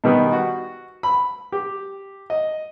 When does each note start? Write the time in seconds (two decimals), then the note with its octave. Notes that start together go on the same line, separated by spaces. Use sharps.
0.04 B2 D#3 G3 B3
0.33 F#4
1.03 B5
1.52 G4
2.30 D#5